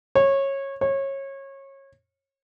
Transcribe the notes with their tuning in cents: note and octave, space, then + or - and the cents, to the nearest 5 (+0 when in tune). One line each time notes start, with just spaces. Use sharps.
C#5 -20
C#5 -25